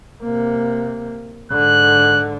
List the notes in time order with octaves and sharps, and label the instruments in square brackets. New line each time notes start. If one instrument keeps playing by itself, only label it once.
[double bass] C3 A#3
[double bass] G#2 D3 [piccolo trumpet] F#6